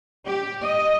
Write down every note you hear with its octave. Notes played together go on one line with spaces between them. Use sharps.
G4
D#5